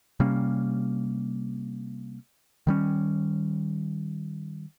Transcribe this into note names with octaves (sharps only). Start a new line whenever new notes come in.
C3 G3 A#3 C#4
D#3 G3 C#4